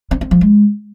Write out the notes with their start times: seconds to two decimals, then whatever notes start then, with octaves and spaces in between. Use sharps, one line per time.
0.11 C4
0.21 C4
0.31 F3
0.41 G#3